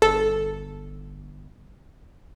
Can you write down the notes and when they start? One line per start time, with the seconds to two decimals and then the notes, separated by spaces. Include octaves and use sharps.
0.02 G1 A4